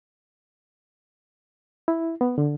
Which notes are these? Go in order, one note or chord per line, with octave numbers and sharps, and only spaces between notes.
E4
B3
D3